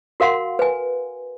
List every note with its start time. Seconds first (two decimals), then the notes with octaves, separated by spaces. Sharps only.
0.20 F#4 A#4 F5 F#5 C6
0.59 B4 G#5